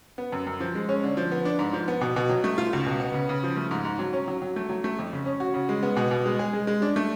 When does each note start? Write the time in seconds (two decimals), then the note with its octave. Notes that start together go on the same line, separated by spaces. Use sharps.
0.18 B3
0.32 F#2
0.47 F#2
0.60 F3
0.75 G#3
0.89 C#4
1.03 D3
1.17 F3
1.31 B3
1.45 D4
1.59 G#2
1.73 F3
1.88 B3
2.01 B2
2.16 B2
2.29 F#3
2.44 A3
2.58 F4
2.73 C#2
2.86 B2
3.00 B3
3.14 C#3
3.29 C#3
3.43 F3
3.57 A3
3.71 G#2
3.85 G#2
3.99 F#3
4.13 C#4
4.28 F#3
4.42 F#3
4.56 A3
4.69 F#3
4.84 A3
4.99 F2
5.13 C#3
5.26 C#4
5.40 F#4
5.54 C#3
5.69 G#3
5.83 B3
5.97 B2
6.11 B2
6.26 G#3
6.39 G#4
6.53 G#3
6.67 G#3
6.82 D4
6.96 A3